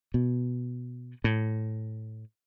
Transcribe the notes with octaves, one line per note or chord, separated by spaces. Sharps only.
B2
A2